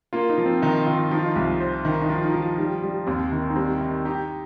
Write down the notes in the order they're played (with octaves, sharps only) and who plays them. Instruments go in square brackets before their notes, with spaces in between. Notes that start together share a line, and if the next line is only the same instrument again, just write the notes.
[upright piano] A#3 [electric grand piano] F4
[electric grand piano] D#4
[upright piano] F3
[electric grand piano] C4
[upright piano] D#3 [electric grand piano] D#4
[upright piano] D#3 [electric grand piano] F4
[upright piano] F3 [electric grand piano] D#4
[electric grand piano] F4
D#4
[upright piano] C2
C5
D#3
[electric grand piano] D#4
[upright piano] F3 [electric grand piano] F4
[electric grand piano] D#4
[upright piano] F3
[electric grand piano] F4
[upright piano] G3 [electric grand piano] D#4
[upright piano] G3
[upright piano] D#2 [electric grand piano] C4
[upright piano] D#3
[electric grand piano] D#4
[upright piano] G3 [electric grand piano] C4
[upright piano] D#3
[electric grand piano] D#4 [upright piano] G4